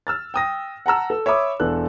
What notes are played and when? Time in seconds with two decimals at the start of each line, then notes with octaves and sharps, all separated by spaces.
0.07 E6 F6 A6
0.34 G5 D#6 A#6
0.86 F#5 A5 A#5 E6
1.10 A4
1.26 C#5 E5 B5 D6 D#6
1.60 E1 D4 A4 F#6